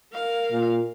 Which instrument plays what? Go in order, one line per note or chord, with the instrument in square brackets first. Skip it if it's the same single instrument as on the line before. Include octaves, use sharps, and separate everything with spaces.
[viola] A#4 F5
[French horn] A#2